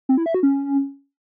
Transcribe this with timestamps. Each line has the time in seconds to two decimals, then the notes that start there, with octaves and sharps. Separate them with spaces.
0.09 C4
0.17 E4
0.26 E5
0.34 F#4
0.43 C#4